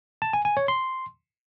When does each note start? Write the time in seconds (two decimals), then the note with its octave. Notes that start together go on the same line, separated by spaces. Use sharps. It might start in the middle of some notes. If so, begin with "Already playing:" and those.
0.22 A5
0.33 G#5
0.45 G#5
0.57 C#5
0.68 C6